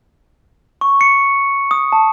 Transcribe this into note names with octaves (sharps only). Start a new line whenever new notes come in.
C#6
C#7
D#6
A5